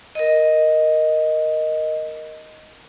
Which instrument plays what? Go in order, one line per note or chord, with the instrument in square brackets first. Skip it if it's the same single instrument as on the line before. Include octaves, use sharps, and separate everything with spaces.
[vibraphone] A#4 D#5